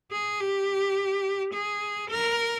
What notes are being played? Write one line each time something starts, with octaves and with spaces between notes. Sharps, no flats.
G#4
G4
G#4
A#4